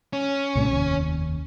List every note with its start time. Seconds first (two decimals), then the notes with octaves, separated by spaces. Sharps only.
0.13 C#4
0.55 C2 A2 C3
0.72 F1 D#2